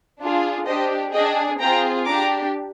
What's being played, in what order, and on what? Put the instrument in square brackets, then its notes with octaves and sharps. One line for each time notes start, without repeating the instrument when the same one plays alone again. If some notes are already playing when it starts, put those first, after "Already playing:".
[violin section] D4 F4 G#4
D4 G4 C5 D#5
D4 G#4 D#5 G5
C4 F4 G#4 G5 A#5
D4 G4 A#5 D6